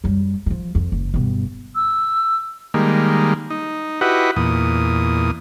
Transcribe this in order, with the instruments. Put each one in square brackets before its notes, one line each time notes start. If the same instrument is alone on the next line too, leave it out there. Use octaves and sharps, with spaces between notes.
[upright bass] F#2 G3
E3 F3
F2
F#1
G2 B2
[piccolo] E6
[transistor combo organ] D#3 G3 G#3 A#3
D#4
E4 F#4 G4 B4 D#5 F#5
E2 A#2 D#6